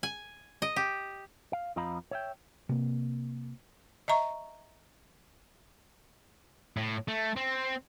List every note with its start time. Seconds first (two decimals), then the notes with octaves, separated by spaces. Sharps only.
0.03 G#5
0.62 D#5
0.76 G4
1.53 F5
1.76 F2 F3 D#5 F5 A#5 B5
2.11 C#5 E5 G5
2.69 C3 A#3
4.08 D#5 E5 A#5 C#6
6.77 A2
7.08 A3
7.36 C4